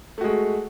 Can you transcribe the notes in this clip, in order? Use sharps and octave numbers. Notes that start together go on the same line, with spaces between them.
G#3 A3 F#4